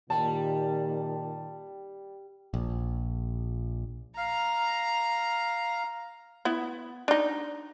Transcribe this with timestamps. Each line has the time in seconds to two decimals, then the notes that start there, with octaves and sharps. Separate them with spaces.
0.10 A#2 D#3 G3 G5 A5
2.54 A#1
4.17 F5 A#5 F6
6.45 B3 E4
7.08 D4 D#4